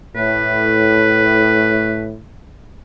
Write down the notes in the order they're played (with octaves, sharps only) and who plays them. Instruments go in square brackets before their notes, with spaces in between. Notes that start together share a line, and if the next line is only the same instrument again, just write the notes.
[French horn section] A2 [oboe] B4